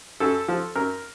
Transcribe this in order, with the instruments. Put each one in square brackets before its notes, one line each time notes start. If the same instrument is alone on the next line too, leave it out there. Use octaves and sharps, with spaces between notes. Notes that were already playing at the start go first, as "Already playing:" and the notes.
[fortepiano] F#2 A4
F3
F#2 A#4